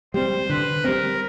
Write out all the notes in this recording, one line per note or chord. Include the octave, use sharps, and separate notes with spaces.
G3 C4 C5
D3 B4
G3 C4 A#4